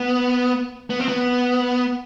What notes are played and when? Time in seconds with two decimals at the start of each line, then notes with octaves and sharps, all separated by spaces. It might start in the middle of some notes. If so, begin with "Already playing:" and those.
Already playing: B3
0.90 B3
1.00 C4
1.08 B3